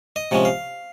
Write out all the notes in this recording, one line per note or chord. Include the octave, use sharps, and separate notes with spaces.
D#5
C3 F3 G#3 C#4
F5